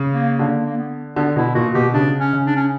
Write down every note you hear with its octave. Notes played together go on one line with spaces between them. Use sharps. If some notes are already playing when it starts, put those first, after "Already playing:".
Already playing: C#3
A#3
D3 A#3
A#3
B3
D3 B3
B2 E4
A#2 F#4
B2 G4
C#3 D4
C#4
C#3
D4
C#4